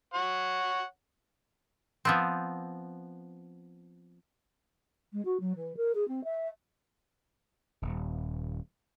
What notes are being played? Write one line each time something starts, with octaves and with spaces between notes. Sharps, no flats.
C#5 F#5
F3 B3 C4
G#3
F#4
F#3
E3
A#4
G#4
C4
E5
D#1